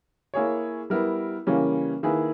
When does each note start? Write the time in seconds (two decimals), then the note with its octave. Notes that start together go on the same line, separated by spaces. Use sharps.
0.34 A#3 E4 G#4 C#5
0.90 G3 B3 E4 A#4
1.47 C#3 E3 G3 A#3 C#4
2.03 D#3 A#3 E4 G#4 B4